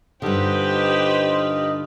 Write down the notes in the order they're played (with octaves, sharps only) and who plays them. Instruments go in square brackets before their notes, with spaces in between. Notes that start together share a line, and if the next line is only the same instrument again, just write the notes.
[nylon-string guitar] G2 D3 [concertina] D#4 F4 D#5 [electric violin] G4 B4 [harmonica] C5